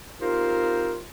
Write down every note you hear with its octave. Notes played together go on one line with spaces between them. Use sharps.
C4 D#4 F4 G4 A#4 C5